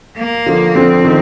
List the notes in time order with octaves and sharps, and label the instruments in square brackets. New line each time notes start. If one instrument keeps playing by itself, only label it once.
[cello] A#3
[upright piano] D3 F3
[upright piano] D3 F3 [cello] C4
[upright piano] D#3